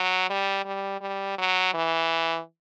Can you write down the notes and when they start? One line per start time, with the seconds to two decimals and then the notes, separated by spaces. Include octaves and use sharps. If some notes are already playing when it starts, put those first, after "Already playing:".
Already playing: F#3
0.30 G3
0.65 G3
1.01 G3
1.38 F#3
1.74 E3